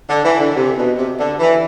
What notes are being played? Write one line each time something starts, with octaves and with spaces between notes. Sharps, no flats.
D3
E3
D3
D3
C3
B2
C3
D3
E3